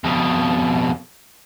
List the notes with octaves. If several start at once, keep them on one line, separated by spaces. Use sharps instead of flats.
F2 B2